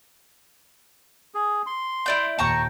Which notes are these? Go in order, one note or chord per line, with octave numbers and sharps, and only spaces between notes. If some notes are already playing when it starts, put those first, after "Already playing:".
G#4
C6
E4 D5 G6
D#2 A#2 G5 A5 A#5 C#6